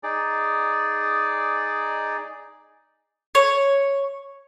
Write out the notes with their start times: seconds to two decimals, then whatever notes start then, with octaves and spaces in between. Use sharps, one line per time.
0.03 D#4 G#4 D5
3.35 C#5